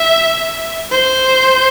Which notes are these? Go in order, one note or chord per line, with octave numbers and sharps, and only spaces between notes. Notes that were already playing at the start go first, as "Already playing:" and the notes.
Already playing: E5
C5